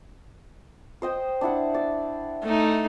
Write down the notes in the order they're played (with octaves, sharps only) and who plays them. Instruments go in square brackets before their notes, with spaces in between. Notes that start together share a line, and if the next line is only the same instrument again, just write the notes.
[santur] C5 D#5 G5
D4 E4 F#5
D5
[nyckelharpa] A3 D#4